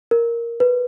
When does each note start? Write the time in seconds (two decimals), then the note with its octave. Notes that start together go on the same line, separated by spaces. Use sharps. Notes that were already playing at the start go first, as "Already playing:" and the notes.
0.11 A#4
0.60 B4